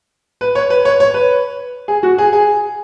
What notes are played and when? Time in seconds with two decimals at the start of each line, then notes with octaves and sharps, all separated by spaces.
0.41 B4
0.55 C#5
0.70 B4
0.85 C#5
1.00 C#5
1.14 B4
1.88 G#4
2.03 F#4
2.18 G#4
2.33 G#4